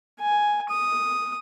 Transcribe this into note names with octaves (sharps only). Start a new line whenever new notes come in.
G#5
D#6